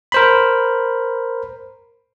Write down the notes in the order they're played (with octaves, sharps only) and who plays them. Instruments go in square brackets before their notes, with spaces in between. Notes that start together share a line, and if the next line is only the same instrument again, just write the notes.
[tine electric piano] A#4 C5 B5